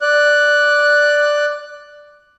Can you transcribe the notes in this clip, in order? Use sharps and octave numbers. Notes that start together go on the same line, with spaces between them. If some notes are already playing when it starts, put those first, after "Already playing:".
D5 F#6